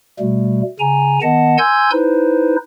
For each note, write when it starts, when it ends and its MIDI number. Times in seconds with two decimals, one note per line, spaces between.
0.20 0.62 47
0.20 0.62 55
0.20 0.62 57
0.79 1.19 49
0.79 1.19 80
0.79 1.19 82
1.22 1.57 51
1.22 1.57 59
1.22 1.57 75
1.22 1.57 78
1.22 1.57 81
1.58 1.90 80
1.58 1.90 84
1.58 1.90 88
1.58 1.90 91
1.58 1.90 92
1.92 2.56 63
1.92 2.56 64
1.92 2.56 71
1.92 2.56 72